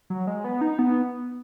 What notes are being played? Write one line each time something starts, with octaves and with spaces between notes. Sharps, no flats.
F#3
G#3
B3
D#4
B3